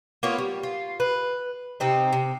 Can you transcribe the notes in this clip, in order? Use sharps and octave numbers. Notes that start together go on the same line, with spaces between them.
A#3 B3 F4 C#5
G3
F4
B4
C3 C4 D#4
C3